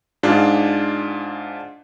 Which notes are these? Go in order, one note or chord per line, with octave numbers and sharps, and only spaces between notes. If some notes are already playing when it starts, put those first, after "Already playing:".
G#2 D4 F4 G#4